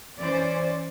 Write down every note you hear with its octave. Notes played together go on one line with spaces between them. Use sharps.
E3 C#4 C5 D5